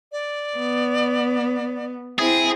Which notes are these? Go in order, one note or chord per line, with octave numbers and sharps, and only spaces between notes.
D5
B3
C4 E4 G#4